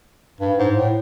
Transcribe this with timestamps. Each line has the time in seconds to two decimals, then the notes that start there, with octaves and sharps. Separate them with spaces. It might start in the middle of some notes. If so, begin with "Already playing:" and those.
0.40 G2
0.58 G#2
0.76 A2